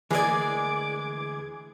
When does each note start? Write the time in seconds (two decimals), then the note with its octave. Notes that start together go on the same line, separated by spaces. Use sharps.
0.11 D2 E3 G#3 A#3 G#4 D5 D6 G#6